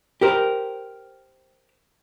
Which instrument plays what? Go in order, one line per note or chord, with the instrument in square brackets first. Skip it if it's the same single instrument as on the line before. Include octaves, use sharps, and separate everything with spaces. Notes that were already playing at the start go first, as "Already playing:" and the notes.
[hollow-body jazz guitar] G4 A#4 C5